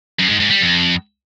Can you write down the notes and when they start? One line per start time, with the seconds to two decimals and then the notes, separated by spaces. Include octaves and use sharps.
0.19 F#2
0.29 G#2
0.40 G#2
0.50 G3
0.61 F2